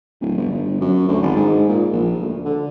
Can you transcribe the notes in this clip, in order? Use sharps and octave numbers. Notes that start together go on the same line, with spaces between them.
D1
G1
G1
F#2
D2
G#1
G#2
A#2
A#1
D2
D3